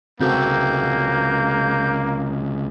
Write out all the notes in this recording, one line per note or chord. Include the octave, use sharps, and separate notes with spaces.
C#2 C3 A#3 C4 F#4 A4 G6